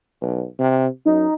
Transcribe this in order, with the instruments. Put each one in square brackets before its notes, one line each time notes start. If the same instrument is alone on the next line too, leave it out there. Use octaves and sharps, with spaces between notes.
[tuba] B1
C3
[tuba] F#2 [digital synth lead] D#4